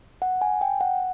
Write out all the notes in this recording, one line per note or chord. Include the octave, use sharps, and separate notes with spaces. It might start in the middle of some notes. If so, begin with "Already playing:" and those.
F#5
G#5
G5
F#5